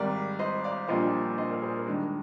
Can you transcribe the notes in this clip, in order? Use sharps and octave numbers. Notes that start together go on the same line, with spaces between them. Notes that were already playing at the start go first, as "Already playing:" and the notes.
Already playing: G#1 G#2 G3 A#4 D5
C5 D#5
D5 F5
A#1 A#2 G3 A#3 D4 C5 D#5
C5 D#5
A#4 D5
G#4 C5
A#4
G2 D#3 G#3 D4 A#4